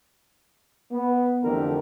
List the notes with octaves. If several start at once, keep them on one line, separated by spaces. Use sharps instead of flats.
B3
F2 D3 E3 A3 G4 A#4